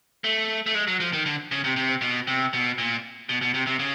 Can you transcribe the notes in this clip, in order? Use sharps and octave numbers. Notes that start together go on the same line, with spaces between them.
A3
A3
G#3
F#3
F3
D#3
D3
C#3
C3
C3
B2
C3
B2
A#2
B2
B2
C3
C3
C#3